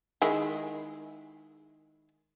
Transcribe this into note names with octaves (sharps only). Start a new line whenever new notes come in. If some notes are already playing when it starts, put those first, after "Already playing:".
D#3 G#3 E4